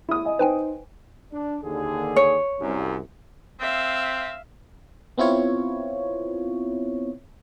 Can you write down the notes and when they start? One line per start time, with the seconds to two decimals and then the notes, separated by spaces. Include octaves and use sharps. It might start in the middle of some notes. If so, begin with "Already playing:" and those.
0.09 E4 D#6
0.25 D#5 G#5
0.39 D#4 B4 C5 G5 G#5
1.32 D4
1.63 D#2 D3 G#4
2.16 C#5
2.60 C2 F#2
3.61 C4 E5 F5
5.18 B3 C4 E4 F4 C#5